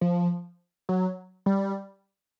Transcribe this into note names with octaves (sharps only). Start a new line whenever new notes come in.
F3
F#3
G3